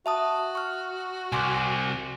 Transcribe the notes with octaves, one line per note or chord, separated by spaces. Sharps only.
F#4 E5 A5 D#6
C#6 F6
C2 G#5 C6 D6